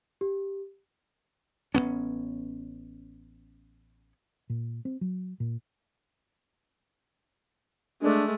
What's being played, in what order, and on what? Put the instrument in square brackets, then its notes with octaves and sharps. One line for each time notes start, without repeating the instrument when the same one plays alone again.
[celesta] G4
[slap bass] A1 F3 B3 C#4
[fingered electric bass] A#2
C4
F#3
A#2
[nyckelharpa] G#3 A3 [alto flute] D4